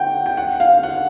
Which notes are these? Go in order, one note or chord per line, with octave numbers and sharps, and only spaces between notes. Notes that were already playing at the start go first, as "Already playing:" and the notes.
Already playing: F#5 G5
G5
F#5
F5
F#5